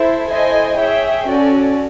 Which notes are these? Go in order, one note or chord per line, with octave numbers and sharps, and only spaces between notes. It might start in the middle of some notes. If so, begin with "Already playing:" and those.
Already playing: E4 A4 C5
E4 A4 C5 D#5 G#5
G#4 C#5 E5 G5
C#4 F#4 A4 D5